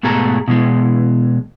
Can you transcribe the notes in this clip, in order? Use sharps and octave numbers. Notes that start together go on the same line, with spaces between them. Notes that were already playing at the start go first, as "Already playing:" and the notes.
G#2 B2 A3 G#4 A4 A#5
B2 E3 G#3